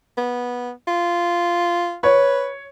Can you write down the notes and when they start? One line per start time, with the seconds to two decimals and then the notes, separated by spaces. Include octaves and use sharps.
0.18 B3
0.88 F4
2.03 B4 C#5